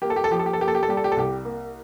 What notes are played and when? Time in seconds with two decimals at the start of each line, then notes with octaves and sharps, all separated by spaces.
0.02 A#3 G4
0.10 A4
0.16 G4
0.24 A4
0.31 F3 G4
0.39 A4
0.46 G4
0.53 A4
0.59 A#3 G4
0.68 A4
0.75 G4
0.83 A4
0.89 G3 G4
0.97 A4
1.04 G4
1.12 A4
1.17 C2 G4
1.45 A#3